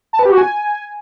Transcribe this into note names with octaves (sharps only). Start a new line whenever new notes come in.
A5
B4
G4
F#4
G#5